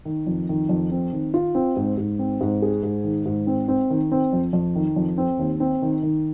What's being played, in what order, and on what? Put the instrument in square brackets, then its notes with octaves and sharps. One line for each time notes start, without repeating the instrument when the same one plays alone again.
[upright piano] D#3
F2
D#3
F2
C4
D#3
F4
C4
G#2
G#2
C4
G#2
G#4
G#2
D#3
G#2
C4
C4
D#3
C4
F2
F2
D#3
F2
C4
D#2
C4
D#3
D#3